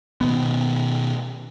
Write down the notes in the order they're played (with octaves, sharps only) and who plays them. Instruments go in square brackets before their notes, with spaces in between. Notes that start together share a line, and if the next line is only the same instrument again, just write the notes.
[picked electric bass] B2 D#3 B3